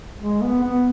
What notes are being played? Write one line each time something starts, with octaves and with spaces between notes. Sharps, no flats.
G#3
B3
B3